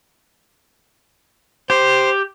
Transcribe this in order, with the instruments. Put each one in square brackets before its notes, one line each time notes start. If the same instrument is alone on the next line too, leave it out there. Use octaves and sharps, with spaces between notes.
[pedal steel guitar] G4 [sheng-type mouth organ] C5